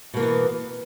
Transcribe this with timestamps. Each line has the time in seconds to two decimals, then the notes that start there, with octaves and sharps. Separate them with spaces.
0.14 B2
0.17 A#3
0.20 E3
0.23 B3